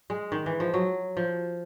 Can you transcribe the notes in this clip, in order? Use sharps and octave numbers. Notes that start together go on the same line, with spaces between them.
G#3
D#3
E3
F3
F#3
F3